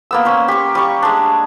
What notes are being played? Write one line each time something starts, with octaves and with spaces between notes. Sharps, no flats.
A#3 B3 E6
C#4 C5 C6
G4 C#6
G3 C#6
G#3 D4